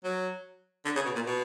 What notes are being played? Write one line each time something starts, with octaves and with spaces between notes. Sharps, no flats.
F#3
D3
C#3
B2
A#2
B2